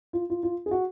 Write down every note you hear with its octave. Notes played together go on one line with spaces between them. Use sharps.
F4
F4
F4
G#4
F#4